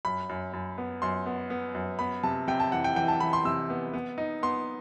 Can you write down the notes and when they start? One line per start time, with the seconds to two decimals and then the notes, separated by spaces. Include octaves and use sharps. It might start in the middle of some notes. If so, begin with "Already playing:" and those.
0.05 F#2 B5
0.29 F#2
0.53 F#2
0.78 B3
1.02 F#2 C6
1.26 B3
1.50 B3
1.75 F#2
1.99 B3 B5
2.23 C3 A5
2.48 C3 G5
2.60 A5
2.72 E3 F#5
2.84 G5
2.96 E3 G5
3.08 A5
3.20 E3 B5
3.33 C6
3.45 C3 E6
3.70 B3
3.94 B3
4.18 D#4
4.43 B3 C6